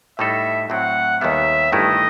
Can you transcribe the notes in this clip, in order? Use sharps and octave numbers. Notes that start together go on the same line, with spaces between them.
A2 G3 D#4 A4 E5
A2 F#3 C4 F#5
D#2 D#3 G3 B3 E5
G1 G2 D#3 A3 E4 D#5